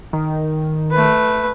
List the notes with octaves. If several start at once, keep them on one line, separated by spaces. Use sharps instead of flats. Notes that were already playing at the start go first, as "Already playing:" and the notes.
D#3
A3 B4